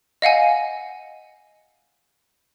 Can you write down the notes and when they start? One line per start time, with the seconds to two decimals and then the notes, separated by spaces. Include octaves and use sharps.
0.22 D#5 F5 F#5 G#5